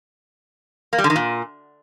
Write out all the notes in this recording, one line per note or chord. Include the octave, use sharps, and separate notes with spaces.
A#3
G3
D3
D#3
A#2